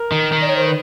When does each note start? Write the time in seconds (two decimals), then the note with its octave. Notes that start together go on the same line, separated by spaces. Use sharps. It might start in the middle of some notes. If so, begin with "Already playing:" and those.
Already playing: A#4
0.12 D#3
0.32 D#3
0.40 D5
0.48 C#5
0.57 C5
0.65 B4